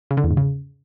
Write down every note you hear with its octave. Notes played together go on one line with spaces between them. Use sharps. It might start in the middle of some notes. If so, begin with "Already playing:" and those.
C#3
D3
E2
G#2
C#3